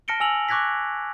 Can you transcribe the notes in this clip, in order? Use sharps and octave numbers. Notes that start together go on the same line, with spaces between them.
A5 F6 A#6 C#7 D7 G7
G#5 E6 F7 F#7
C#6 D6 F#6 G#6 A#6 B6